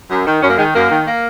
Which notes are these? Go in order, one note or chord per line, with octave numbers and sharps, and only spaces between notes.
F#2
D#3
F#2 C#4
A#3
D#3 G#3
F#2 A#3
D#3
A#3